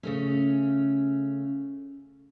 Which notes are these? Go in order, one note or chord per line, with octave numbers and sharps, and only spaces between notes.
C#3 A3 C#4